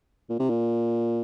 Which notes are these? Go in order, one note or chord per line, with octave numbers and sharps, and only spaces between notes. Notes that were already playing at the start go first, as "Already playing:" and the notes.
A#2
C3
A#2